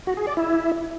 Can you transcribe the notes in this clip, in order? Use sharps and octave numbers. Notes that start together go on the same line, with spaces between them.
F#4
G#4
D5
E4